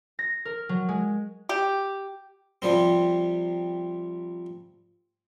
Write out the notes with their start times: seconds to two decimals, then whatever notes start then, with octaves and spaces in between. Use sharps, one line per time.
0.19 A#6
0.45 A#4
0.69 F#3
0.89 G#3
1.49 G4
2.62 C3 F3 G3 C4